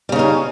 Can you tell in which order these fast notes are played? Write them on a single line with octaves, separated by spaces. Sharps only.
G3 C#3 D#4 C#4